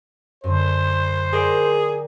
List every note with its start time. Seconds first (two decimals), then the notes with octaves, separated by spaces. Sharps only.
0.44 F#2 D3 C5
1.33 G#4 A#4 D5 G5